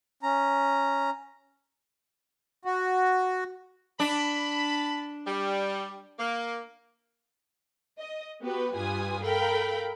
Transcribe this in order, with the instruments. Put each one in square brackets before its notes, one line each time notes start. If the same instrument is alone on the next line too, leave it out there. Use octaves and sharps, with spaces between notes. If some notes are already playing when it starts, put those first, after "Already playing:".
[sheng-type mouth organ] C#4 A#5
[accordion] F#4
[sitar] D4 [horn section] A5 B5
[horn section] G3
A#3
[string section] D#5
B3 F#4 G4 B4
G2 G3 F4 B4 G#5 D#6
A4 A#4 F5 G5 B5